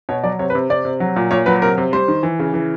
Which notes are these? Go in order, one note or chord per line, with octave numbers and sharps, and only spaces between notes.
B2 C#5
F#3 D5
C3 C#5
B4
C3
C3 D5
C3
F#3
A#2
A#2 C#5
F#3 B4
C3 A#4
C3
G3 C5
D#3
E3
C#3
E3